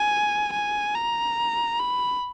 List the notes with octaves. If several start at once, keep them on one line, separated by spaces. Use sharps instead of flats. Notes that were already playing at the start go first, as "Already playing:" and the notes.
Already playing: G#5
G#5
A#5
B5